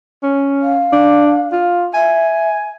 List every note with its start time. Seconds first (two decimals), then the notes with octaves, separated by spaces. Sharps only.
0.23 C#4
0.62 F5
0.92 D4
1.52 F4
1.94 E5 G#5